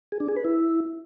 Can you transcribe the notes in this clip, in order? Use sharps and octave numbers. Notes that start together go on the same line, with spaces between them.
G#4
D4
G#4
B4
E4